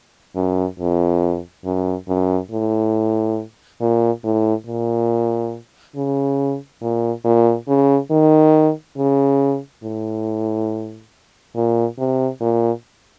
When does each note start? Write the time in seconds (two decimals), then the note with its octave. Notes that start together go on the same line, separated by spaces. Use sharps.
0.36 F#2
0.79 F2
1.65 F#2
2.08 F#2
2.51 A2
3.81 A#2
4.24 A2
4.67 A#2
5.96 C#3
6.82 A#2
7.25 A#2
7.68 C#3
8.11 D#3
8.98 C#3
9.83 A2
11.55 A#2
11.98 C3
12.41 A#2